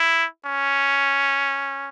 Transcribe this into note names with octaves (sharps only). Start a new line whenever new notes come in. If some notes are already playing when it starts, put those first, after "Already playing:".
Already playing: E4
C#4